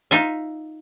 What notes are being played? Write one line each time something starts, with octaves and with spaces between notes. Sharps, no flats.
D#4 F4 E5